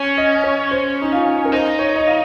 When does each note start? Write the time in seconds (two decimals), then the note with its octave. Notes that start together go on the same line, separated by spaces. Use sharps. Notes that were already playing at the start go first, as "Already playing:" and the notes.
Already playing: C#4 C#5
0.18 D#5
0.44 C#5
0.71 C5
1.02 D#4
1.12 F4
1.45 A#4
1.52 D#4 C5
1.79 C#5
1.96 D#5
2.07 F5